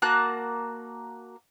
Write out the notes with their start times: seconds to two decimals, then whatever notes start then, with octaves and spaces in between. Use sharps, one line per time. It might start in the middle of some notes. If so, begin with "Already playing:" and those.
0.02 A#3 F#4 A5 F#6